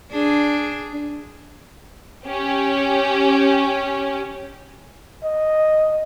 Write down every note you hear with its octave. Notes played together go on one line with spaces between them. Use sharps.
D4 G#4
C#4 G4
D#5